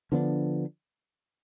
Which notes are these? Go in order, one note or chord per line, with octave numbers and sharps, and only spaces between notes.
D3 F3 B3 D4